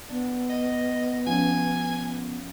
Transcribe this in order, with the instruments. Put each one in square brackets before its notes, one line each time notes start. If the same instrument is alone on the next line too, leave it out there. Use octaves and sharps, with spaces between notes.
[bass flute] B3 [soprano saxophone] D4
[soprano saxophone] D#5
[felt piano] F3 C#4 [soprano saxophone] G#5